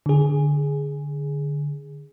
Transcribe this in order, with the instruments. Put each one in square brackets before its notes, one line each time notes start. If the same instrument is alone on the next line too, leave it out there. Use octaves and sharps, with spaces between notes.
[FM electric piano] D3 G#4